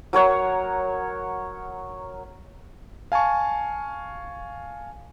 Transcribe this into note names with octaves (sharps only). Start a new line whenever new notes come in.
F#3 A#4 C#5 F#5
F5 G#5 A5 C#6